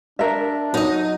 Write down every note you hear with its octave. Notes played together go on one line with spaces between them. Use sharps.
D4 A#4 E5
F#3 D#4 D#5